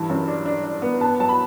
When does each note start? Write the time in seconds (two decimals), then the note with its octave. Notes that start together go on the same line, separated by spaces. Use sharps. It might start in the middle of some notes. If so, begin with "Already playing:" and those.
Already playing: G2 E3 A5
0.09 F#2
0.28 D4
0.46 D4
0.64 D4
0.82 B3
1.01 B3 A5
1.19 F#3 A5
1.29 B5